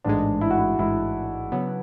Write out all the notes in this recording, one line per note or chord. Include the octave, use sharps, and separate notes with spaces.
A1 G#2 G#3 D4
E4
F#4
E4
A1 G#2 G#3 E4
C#3 F#3 B3